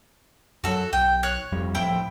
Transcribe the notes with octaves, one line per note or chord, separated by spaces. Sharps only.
F#2 F#3 F#4 A4
B1 G5
C#5 F#6
F1 F2 G3
D1 A2 F3 E4 G5